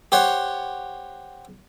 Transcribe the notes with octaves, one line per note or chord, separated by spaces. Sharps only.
G4 C5 C#5 F#5